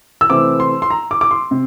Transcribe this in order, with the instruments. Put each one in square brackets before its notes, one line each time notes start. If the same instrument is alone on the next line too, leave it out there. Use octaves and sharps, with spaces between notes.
[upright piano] E6
C3 E3 A3 C4 D6
C6
C6
A#5
D6
D6
C6
C3